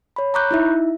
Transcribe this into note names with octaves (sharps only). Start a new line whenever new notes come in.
C#5 B5
A#5 B5 C#6 D6 F#6 G6
D#4 E4 E5